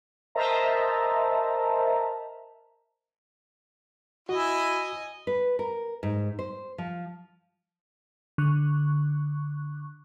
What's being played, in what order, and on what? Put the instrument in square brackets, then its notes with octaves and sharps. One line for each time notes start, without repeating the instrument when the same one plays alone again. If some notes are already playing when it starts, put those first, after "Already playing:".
[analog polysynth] A#4 C5 D#5 E5 A5 A#5
[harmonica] E4 [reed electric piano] F#4 [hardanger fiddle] D#5 G#5
[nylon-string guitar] B4
A#4
G#2
C5
F3
[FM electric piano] D3 C#6 F#6